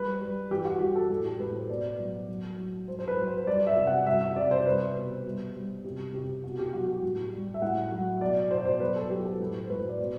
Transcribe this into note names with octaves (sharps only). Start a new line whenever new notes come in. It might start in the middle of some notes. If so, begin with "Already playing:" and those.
Already playing: G3 B4
G3
E3 G4
F#4
G3 G4
A4
A2 A4
A4
G4
A2 B4
C5
B2 D5
F#3
F#3
F#3
F#3 C5
C5
B4
F#3
C5
G3 D5
E5
C3
F#5
G3 E5
E5
C3 D5
C5
G3 B4
B2
G3
G3
C3 G4
C3 G4
B2 F#4
G4
F#3 F#4
G4
A2
G3
E5
A2 F#5
F#3
B2 D5
B2 C5
D5
C5
F#3 B4
A4
F#3 G4
A4
A2 B4
C5
A2 B4
D5
B2 C5